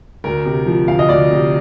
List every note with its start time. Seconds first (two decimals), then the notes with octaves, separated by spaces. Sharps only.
0.24 D2 A#4
0.45 C3
0.66 F3
0.88 D2 F5
0.99 D#5
1.09 D2 D5
1.31 C3